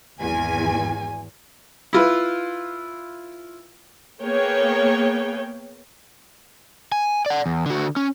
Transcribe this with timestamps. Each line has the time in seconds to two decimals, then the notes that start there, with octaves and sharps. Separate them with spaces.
0.19 G#1 E2 G#5
1.93 E4 F4 B4
4.22 A#3 B3 G#4 C#5 G5
6.92 G#5
7.26 D5 F#5
7.46 E2
7.66 D3 F#4
7.96 C#4